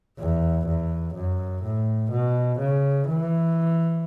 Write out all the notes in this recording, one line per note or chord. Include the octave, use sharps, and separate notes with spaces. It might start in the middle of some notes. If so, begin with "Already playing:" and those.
E2
E2
F#2
A2
B2
C#3
E3